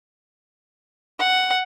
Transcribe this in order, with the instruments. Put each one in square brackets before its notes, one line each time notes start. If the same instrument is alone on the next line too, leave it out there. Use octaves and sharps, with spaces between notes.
[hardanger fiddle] F#5